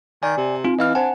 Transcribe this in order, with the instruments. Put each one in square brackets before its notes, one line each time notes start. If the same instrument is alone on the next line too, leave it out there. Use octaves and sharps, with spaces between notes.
[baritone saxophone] D#3 [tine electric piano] D5 G#5
[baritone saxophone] C3
[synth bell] C4 [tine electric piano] F4
[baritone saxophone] E3 [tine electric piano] D#5 F5 F6
[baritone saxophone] D4 [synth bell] C5 G#5 [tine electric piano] F#5